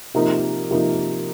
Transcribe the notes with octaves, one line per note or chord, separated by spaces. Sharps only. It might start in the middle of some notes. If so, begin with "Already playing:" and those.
C3 F3 A#3 D#4
C3 F3 A#3 D#4